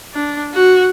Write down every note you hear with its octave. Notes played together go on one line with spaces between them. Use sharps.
D4
F#4